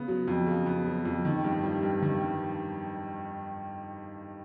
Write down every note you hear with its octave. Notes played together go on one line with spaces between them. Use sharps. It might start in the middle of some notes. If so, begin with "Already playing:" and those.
Already playing: C#3 B3
F#3
F2
C#3
B3
F#3
F2
D#3
G2
G3
G2
D#3
G2